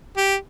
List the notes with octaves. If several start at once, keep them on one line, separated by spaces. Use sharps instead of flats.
G4